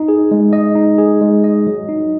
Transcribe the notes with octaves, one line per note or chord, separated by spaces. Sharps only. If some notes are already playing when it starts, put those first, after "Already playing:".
Already playing: D#4
G#4
G#3
D#5
D#4
G#4
G#3
D#5
F#3
D#4